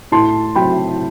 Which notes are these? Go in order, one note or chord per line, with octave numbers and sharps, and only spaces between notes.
A2 A5 C6
F#3 C4 G5 B5